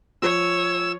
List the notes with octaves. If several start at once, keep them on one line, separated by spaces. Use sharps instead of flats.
F3 C#5 E6